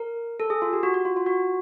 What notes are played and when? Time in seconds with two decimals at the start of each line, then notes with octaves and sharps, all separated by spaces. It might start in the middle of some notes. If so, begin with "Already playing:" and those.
Already playing: A#4
0.40 A4
0.50 G#4
0.62 F4
0.73 G4
0.83 F#4
0.94 F#4
1.05 F4
1.16 F4
1.26 F#4